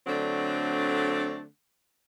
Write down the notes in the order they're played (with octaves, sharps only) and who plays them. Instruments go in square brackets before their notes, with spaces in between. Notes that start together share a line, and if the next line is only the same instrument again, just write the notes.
[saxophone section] D3 F#3 A3 C4 D4